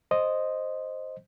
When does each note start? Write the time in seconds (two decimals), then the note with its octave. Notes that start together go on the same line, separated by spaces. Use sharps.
0.11 C5 D#5